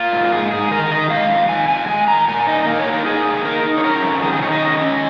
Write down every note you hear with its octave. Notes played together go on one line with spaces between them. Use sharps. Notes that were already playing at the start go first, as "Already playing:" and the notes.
Already playing: A#3 F4
G#2
G#2 G#4
G#2 G#4
D#3 A#4
D#3 D#5
G#3 F5
F2
D#3 G#5
F2 G#5
G#3 G#5
D#3 A#5
A#2 G#5
D#4 D#5
A#3 A#4
C#5
D#4
A#4
D#4 G#4
A#3
D#4 A#4
D#4
C#5
C#4 A#4
F2
D#3 G#4
G#4
D#3 C#5
D#5
C#4
C#4